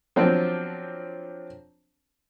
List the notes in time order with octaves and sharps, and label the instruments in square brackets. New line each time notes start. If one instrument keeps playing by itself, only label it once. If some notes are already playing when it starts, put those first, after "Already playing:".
[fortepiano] F3 F#3 C4 D4